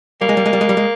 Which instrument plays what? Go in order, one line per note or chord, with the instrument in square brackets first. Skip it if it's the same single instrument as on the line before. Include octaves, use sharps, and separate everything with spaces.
[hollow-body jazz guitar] G3 [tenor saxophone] A#3
[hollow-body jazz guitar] G#3
G3
G#3
G3
G#3
G3
G#3